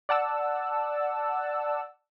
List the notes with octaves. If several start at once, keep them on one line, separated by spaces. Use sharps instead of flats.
D5 F#5 A5 E6